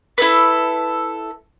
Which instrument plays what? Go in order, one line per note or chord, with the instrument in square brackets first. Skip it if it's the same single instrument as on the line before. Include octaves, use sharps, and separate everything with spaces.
[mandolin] E4 A4 B4